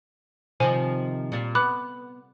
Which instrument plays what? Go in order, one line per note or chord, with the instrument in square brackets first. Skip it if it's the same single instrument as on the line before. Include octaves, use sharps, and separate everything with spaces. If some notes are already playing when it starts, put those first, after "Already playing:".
[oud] C3 D#3 F3 [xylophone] C5 G#5
[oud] A#2 G3
[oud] B3 [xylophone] B5 D6 F#6